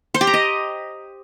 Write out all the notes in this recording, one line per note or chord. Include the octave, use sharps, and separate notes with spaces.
C5
G4
A#5
D#5